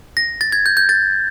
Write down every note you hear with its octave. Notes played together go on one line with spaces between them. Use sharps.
A#6
A6
G#6
G6
G6
A6